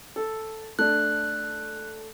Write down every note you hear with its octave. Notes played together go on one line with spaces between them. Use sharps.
A4
A3 D4 F#6